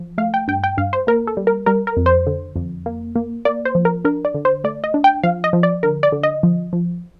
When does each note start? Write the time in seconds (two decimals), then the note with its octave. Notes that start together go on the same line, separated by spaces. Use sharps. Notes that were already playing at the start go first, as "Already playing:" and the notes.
Already playing: F3
0.18 A3 F5
0.34 G5
0.48 G2 G5
0.64 G5
0.78 G2 F5
0.93 C5
1.07 A#3 A#4
1.27 A4
1.37 G3
1.47 A#4
1.66 G3 A#4
1.87 A#4
1.97 F2
2.06 C5
2.27 D3
2.56 F2
2.86 A#3
3.16 A#3
3.45 A#3 D5
3.65 C5
3.75 F3
3.85 A#4
4.05 D4 A#4
4.25 D5
4.35 D3
4.45 C5
4.64 A3 D5
4.84 D#5
4.94 D4
5.04 G5
5.23 F3 F5
5.44 D#5
5.53 F3
5.63 D5
5.83 D3 A#4
6.03 D5
6.12 D3
6.23 D#5
6.43 F3
6.73 F3